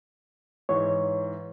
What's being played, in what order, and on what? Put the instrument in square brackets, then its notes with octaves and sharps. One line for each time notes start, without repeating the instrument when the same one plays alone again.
[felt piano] G#2 E3 [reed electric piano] C#5